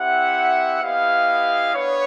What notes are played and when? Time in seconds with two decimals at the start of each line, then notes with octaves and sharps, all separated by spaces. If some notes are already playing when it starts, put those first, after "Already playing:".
Already playing: C4 E4 G4 E5 F#5
0.81 B3 E4 G4 D#5 F5
1.74 B3 D4 B4 C#5